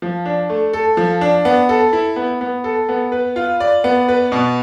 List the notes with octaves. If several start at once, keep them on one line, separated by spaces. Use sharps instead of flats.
F3
D4
A3
A4
F3
D4
B3
A4
E4
B3
B3
A4
B3
B4
F4
D5
B3
B4
B2